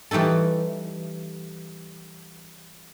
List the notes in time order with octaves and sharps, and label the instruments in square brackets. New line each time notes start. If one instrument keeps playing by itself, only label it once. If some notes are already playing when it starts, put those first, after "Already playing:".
[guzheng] E3 G3 A3 D#4 A4